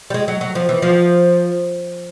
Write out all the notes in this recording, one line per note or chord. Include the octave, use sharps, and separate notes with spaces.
G3
G#3
F#3
F#3
F3
E3
F3